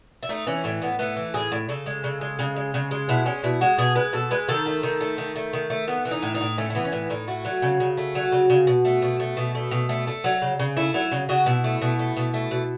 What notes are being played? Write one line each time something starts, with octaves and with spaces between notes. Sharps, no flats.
E4
A3 D#4
E3 C#4
A2 A3
A2 B3
A3 B3
E3
A2 G#4
A2
C#3 A4
G#3
C#3
G#3
C#3
G#3
C#3
G#3
B2 E4
G#3 C#4
B2 E4
G#3 F#4
B2 G#4
G#3 B4
B2 A4
G#3 B4
D#3 A4
A3
D#3
A3
D#3
A3
D#3
A3
A3 B3
E3
D#4
A2
D#4
A2
A3 C#4
A3
E3 B3
C#4
A2 B3
A2 D#4
A3 F#4
F#3
C#3
C#3
A3
F#3
C#3
C#3
B2
A3
B2
A3
B2
A3
B2
A3
A3
F#3
C#3
C#3
A3 E4
F#3 E4
C#3
C#3 F#4
B2 E4
A3
B2
A3
B2
A3
B2